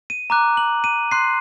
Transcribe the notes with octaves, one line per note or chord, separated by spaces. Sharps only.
D#7
A#5 D6 F#6
F#7
D#7
C6 F#6 C7